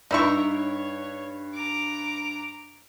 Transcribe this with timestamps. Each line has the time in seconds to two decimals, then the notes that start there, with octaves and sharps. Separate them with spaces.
0.11 G2 D#4 E4 A#4 E5 C#6
0.50 C#5
1.54 A#5 D6